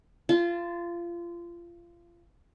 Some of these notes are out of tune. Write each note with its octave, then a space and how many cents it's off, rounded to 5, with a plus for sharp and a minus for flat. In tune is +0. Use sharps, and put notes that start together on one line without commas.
F4 -25 A5 +0